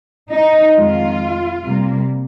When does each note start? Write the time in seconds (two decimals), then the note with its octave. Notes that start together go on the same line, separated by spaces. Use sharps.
0.31 D#4
0.76 F2 D#3 G#3 F4
1.64 C3 G3 A#3